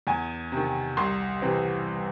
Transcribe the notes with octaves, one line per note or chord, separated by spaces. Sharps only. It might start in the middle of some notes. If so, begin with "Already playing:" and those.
E2 G#5
C3 D#3
C2 C6
C3 E3 C4